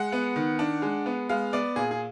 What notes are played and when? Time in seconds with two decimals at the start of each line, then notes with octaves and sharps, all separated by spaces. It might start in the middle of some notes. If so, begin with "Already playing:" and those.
Already playing: G#3 F#5
0.12 B3
0.36 D#3
0.59 D4
0.82 G#3
1.06 B3
1.29 G#3 F5
1.53 B3 D5
1.76 A#2 G#4
1.91 G#4